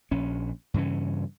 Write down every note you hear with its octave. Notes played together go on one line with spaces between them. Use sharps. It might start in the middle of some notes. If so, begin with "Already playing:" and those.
A#1 C#4
G2 C#3 E3 C#4